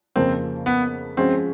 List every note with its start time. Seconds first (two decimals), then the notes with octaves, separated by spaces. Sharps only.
0.16 F2 C#3 F3 A#3 C4
0.66 B3
1.17 F3 G#3 C4 C#4 F#4